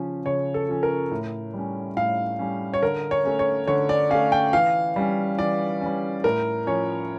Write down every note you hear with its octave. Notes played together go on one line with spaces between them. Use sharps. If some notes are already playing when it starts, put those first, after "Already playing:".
Already playing: C#3 F3 C#4
C#3 C#5
A4
F3 C#4
A#4
A2
G3 C#4
A2 F5
G3 C#4
C#5
D3 A#4
C#5
A3 C#4
C#5
D3 C#5
D5
A3 C#4 F5
G5
E3 F5
G3 C#4
E3 D5
G3 C#4
A2 A#4
F3 C#4 C#5